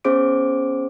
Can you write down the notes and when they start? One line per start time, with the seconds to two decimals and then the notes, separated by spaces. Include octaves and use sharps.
0.04 B3 C#4 G#4 C5 D6 D7